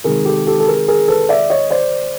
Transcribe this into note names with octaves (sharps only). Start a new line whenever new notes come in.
C3 D#3 G#3 G#4 A#4
G4 A4
G4 A4
A4
G#4 A#4
G#4 A#4
A4 B4
D5 E5
C#5 D#5
C5 D5